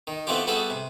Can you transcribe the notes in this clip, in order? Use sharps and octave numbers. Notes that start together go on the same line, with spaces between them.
D#3
A3 B3 C4 E4 F4 G4
G3 B3 F#4 G#4 A4 E5
C3